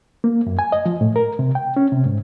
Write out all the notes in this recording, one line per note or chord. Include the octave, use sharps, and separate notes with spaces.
A#3
F#2
G#5
D#5
F3
A2
A#4
C3
G5
C#4
C3
G#2